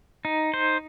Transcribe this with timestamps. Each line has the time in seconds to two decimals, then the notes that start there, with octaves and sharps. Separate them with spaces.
0.25 D#4
0.54 C5